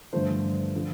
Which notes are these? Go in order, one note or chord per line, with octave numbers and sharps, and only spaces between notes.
G2 D3 F3 A3 C5
D3 F3